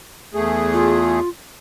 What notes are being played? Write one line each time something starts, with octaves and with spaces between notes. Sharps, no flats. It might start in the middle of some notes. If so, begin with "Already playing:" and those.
E2 A3 G#4
F4